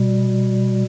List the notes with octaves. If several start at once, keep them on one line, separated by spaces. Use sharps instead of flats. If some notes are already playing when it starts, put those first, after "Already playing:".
Already playing: B2 G3